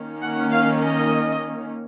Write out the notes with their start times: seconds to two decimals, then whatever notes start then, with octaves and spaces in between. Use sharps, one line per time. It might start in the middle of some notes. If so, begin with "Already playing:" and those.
Already playing: D#3 A#3 C#4
0.22 F#5
0.52 F5
0.81 D#5